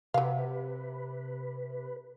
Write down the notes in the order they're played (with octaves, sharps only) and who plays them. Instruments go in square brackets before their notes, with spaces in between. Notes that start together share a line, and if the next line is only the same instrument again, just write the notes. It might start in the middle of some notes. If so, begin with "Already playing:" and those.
[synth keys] C3 [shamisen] F#3 F5 [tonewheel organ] B4